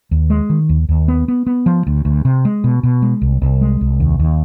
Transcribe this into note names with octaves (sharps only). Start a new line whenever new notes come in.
D#2
G#3
D#3
D#2
D#2
B3
B3
B3
F3
D2
D2
C3
G#3
B2
B2
G#3
C2
C2
G#3
C2
D#2
D#2